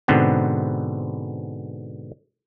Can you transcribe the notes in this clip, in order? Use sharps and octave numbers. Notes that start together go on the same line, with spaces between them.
G#2 B2 D3 B3 C4